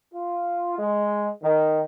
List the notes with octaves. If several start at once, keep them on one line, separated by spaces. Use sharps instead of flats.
F4
G#3
D#3